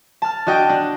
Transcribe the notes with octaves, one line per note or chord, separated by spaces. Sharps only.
A5 F6
D4 F#4 D#5 G5
D4